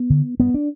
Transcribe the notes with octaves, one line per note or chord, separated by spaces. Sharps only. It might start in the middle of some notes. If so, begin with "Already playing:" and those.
Already playing: B3
D3
G2 B3
D4